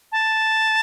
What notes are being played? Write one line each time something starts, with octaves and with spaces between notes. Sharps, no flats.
A5